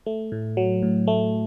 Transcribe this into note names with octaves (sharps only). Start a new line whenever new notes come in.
A3
A2
F#3
A2
A3